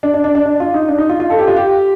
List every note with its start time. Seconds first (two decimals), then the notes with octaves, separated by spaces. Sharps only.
0.03 D4
0.14 D4
0.24 D4
0.35 D4
0.45 D4
0.60 F4
0.74 D#4
0.88 D4
0.98 D#4
1.09 F4
1.20 F4
1.30 A4
1.39 G4
1.48 F4
1.56 G4